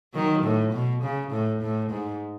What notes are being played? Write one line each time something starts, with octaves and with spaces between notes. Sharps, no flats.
D#3 F#3
A2
B2
C#3
A2
A2
G#2